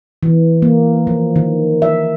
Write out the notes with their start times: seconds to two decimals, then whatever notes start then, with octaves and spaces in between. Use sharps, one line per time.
0.23 E3
0.62 A#3
1.07 F3
1.36 D#3
1.82 E5